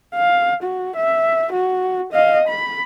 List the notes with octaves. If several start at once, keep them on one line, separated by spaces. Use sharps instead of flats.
F5
F#4
E5
F#4
D#5 F5
B5